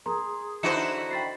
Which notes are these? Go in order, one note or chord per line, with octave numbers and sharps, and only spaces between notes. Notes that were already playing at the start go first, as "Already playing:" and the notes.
G#4 A#4 A#5 C6
D3 D#4 E4 F#4 C5 C#7 E7
G5 B5 A6 C7